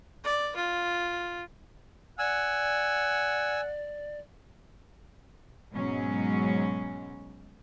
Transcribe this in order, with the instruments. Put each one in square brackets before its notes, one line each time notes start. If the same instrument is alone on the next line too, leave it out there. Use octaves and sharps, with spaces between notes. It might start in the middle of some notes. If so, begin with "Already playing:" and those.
[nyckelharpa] D5
F4
[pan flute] D5 [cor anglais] F#5 [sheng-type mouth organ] G#5 E6
[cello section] G#2 B2 F#3 G#3 C#4